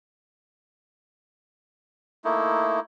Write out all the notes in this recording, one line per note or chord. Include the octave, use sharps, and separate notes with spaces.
A3 A#3 D#4 E4